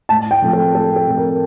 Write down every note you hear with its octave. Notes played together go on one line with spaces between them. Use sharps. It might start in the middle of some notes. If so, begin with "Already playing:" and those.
A2 A5
G5
F3 A3 C4
A4
A2 A4
A4
F3 A3 C4
A#4